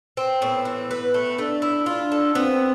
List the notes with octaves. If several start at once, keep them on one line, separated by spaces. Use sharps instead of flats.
C4
A2 B3
E3
B4
A3
A3 D4
E4
D4 F4
A4
B3 C4